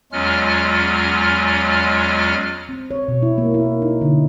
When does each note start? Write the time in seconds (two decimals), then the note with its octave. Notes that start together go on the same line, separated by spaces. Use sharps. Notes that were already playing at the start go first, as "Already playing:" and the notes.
0.12 E2 F#3 G#3 C#4 F4 F6
2.69 C4
2.91 C#5
3.08 B2
3.22 E4
3.38 A#3
3.54 E4
3.82 D#4
4.01 D3